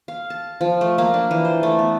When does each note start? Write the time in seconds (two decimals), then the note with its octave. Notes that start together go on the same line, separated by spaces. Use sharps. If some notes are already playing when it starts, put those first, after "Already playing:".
0.08 F5
0.30 A5
0.61 F3
0.81 A3
0.98 A#3
1.14 D4
1.31 E3
1.45 C5
1.63 A3
1.79 B3